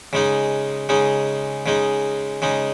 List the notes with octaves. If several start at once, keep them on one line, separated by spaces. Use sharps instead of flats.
C#3 G#3 D#4
C#3 G#3 D#4
C#3 G#3 D#4
C#3 G#3 D#4